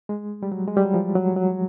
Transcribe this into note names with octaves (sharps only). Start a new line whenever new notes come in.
G#3
G3
F#3
G#3
G3
F#3
F3
F#3
F#3